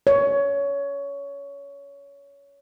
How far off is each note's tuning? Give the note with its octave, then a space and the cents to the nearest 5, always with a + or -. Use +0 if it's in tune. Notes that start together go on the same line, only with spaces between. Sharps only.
C#5 +20